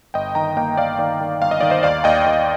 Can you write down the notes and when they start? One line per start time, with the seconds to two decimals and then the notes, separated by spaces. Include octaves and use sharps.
0.14 G1 D#5 G5
0.35 D#3 G5 A#5
0.57 A#3 D#5 G5
0.77 A#3 D5 F5
0.99 D#3 D5
1.21 D#3
1.42 G1 F5
1.51 D#5
1.61 D#3 D5
1.70 C5 D#5
1.83 D#2 D5 F5
2.04 D#2 D#5 G5
2.26 D#2